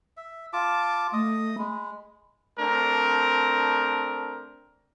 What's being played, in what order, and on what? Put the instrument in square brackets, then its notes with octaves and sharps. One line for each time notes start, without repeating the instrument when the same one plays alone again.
[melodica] E5
F4 A5 D6
[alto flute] A3 [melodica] D#5 D#6
[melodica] G#3 [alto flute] B5
[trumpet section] A3 C4 D4 A#4